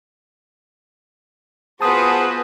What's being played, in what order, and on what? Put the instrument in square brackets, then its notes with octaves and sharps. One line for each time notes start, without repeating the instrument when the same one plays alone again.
[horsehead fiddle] B3 B4 [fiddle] F4 F#4 [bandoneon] G#4 C5 [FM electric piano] A5 D#6